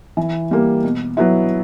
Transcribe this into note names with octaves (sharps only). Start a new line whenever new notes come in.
E3
G3 A#3
B2
F#3 B3 E4